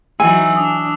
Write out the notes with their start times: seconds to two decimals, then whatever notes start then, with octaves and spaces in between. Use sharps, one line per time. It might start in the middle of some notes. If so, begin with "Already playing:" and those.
0.20 E3 F#3 D#4 G#5 E6
0.56 D4 D#6